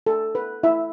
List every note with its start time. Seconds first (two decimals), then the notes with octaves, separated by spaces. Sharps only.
0.07 A4
0.35 B4
0.63 E4 E5